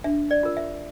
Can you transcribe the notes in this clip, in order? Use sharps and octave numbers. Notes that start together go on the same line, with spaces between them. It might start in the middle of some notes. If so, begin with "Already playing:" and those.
D4 E5
D5
F4 A#4
E5